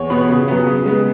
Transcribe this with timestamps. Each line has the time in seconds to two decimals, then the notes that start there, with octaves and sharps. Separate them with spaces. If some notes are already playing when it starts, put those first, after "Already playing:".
Already playing: E2 C#5
0.10 B2 B3 B5
0.29 C#3
0.48 F#3 B3
0.67 C#3
0.86 G#3 B3